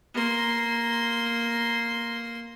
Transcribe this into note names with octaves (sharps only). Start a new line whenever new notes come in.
A#3 C6